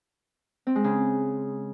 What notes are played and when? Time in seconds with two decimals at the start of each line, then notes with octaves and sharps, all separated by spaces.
0.67 C4
0.75 G#3
0.84 C#3